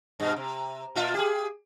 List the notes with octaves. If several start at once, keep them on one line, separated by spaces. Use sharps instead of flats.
G2 B2
C3
A#2 F4 E5
G4 G#4